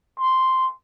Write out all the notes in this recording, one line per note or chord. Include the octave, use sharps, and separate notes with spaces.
C6